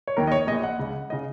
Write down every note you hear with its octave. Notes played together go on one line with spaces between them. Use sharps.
C#5
D#2 D#3 A#4
D#5
C#5
A#1 A#2 D#5
F#5
C#2 C#3
C#3 D#5